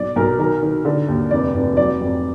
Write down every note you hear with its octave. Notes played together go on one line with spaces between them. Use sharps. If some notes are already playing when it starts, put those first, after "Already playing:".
Already playing: B1 D5
B1 A#4
D#3 A#4
D#3
D3
D#2
F1 D5
F1
F#3 D5
F2